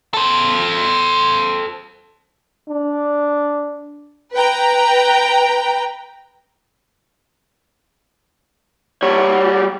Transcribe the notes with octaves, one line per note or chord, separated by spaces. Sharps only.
A4 C5
D4
B4 G5 A#5
G3 C#5